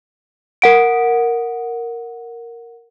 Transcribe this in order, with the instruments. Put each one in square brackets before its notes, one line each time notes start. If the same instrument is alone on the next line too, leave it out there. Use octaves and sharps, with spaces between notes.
[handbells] A#4 F#5 D7